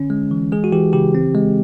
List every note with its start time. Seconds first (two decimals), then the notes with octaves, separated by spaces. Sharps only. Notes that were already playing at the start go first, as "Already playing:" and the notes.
Already playing: D3 C#4
0.10 G#3
0.31 E3
0.52 G#3 G#4
0.64 F#4
0.73 E3 G4
0.93 C#3 G4
1.15 C4
1.35 G#3